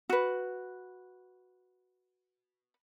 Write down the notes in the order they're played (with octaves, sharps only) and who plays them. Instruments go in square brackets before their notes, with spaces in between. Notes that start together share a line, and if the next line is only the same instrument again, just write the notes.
[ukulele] F#4 B4